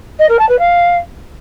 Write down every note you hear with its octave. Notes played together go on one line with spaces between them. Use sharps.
D#5
A#4
A5
B4
F5